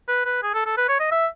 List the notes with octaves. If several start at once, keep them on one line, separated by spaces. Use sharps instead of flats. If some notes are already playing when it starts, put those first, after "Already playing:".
B4
B4
G#4
A4
A4
B4
C#5
D#5
E5